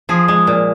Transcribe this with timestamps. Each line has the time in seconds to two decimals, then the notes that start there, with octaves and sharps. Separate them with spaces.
0.09 F3 G#4
0.28 G#3
0.47 A#2